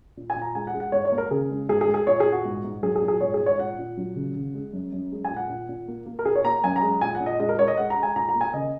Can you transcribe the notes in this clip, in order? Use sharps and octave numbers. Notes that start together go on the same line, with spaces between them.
A#2
G#5
A#2
A#5
G#3 G#5
F#5
G#3
F#5
G#2 C#5
C#5
A#3
A#4
C#3 G#4
G#3
G#2 G#4
G#4
G#3
G#4
A#2 C#5
G#4
A#2
F#4
G#2
G#2
F#3 G#4
G#4
A#2
G#4
G#2 C#5
G#4
G#2
C#5
A#2 F#5
A#2
F#3
C#3
C#3
G#3
F#2
F#2
G#3
G#5
A#2
F#5
A#2
A#2
A#3
A#3
A#4
A#2 G#4
C#5
A#3 A#5
F#2 G#5
A#5
G#3
A#2 G#5
F#5
A#2
D#5
G#3 D#5
A#4
G#3 C#5
D#5
G#3 F#5
A#5
G#3
G#5
A#2 A#5
A#5
A#3
G#5
C#3 D#5